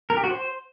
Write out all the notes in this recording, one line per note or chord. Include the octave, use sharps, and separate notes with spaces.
A#4
G4
F#4
C5